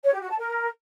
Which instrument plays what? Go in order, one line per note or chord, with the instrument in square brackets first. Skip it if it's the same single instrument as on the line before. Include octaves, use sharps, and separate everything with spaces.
[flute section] C#5
G4
F#4
A5
A#4